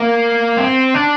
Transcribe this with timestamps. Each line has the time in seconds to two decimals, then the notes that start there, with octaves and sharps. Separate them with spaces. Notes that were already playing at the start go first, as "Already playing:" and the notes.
Already playing: A#3
0.57 C4
0.94 D4